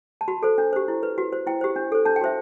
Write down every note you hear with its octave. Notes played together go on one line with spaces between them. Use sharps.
A5
F#4 B5
A4 C5
D4
G4 C5
E4
B4
F#4
C5
E4 G5
G4 C5
D4
A4 C5
D4 A5
G5
F#4 C5 E5